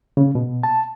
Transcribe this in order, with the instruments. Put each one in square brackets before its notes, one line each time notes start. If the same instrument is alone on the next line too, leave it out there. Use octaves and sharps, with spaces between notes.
[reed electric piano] C#3
B2
A5